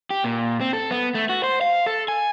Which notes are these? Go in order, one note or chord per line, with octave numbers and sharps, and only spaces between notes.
G4
A#2
C4
A4
B3
A3
F#4
C5
F5
A4
G#5